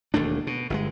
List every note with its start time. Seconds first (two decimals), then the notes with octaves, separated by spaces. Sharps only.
0.14 E1 D#2 A3 D4
0.47 B2
0.70 G1 A#2 G#3